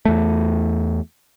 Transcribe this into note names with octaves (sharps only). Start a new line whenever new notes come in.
E2 A3